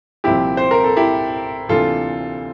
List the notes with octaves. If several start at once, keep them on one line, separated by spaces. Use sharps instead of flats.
C2 A#2 F3 C4 E4 G4
C5
A#4
A4
E4 G4
D2 C3 E3 A#3 D4 F4 A4